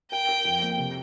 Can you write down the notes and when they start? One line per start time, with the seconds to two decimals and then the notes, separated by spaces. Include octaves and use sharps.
0.12 A#4 G5
0.29 A#4
0.45 F2
0.62 A#3
0.78 C3